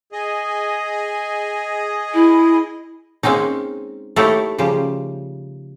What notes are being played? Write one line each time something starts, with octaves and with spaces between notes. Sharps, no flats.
G#4 D#5
E4
G#3 A#3 C4 C#4 D#4
A3 A#3 D#4 E4 G4 C#5
C#3 F3 G3 G4